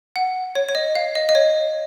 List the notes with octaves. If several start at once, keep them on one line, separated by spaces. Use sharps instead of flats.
F#5
C#5
C#5
D#5
F5
D#5
D#5
C#5